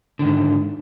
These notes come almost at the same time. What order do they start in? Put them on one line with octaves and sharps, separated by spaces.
D3 D#3 G#2